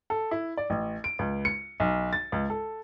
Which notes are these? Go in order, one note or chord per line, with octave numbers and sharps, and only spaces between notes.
A4
E4
D5
A1
D7
C#2
C#7
B1
A6
C#2
A4